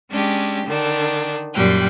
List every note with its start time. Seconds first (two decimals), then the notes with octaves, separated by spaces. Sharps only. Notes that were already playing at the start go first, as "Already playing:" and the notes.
0.10 G#3 C#4 D4 G4
0.66 D3 D#3 D4
1.54 F#2 A#2 G3 G5 F#6